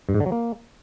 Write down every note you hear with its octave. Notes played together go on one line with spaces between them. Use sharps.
G2
G#2
D3
F#3
A#3